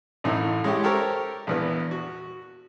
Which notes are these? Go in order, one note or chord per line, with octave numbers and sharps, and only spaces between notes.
A1 F#2 A2 E3 D#4
G#3 C#4 E4 G4
G4 A4 A#4 C5 C#5
A#1 E2 B3
F#4